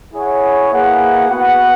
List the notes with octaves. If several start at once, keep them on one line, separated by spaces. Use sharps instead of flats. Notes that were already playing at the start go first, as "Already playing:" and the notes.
E4 G#4 C#5 F#5
A#3 E4 G#4 B4 F#5
B3 F#4 B4 F#5